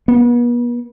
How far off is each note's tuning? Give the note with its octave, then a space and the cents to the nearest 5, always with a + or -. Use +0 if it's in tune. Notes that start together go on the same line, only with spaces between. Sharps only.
B3 -40